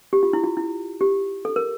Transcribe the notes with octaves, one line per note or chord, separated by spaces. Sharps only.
G4
F4
E4
F4
E4
G4
A4
A#4